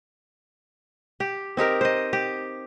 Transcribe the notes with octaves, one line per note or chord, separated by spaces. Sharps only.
G4
C4 D#4 G4 A#4
C5 D#5
G4